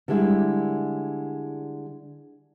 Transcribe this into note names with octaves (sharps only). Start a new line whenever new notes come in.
D3 G3 G#3 E4